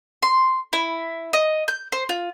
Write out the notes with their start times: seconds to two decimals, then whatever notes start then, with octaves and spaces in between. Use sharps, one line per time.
0.23 C6
0.73 E4
1.33 D#5
1.68 G6
1.92 C5
2.09 F4